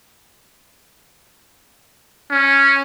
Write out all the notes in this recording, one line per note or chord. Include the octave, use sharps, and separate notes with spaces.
C#4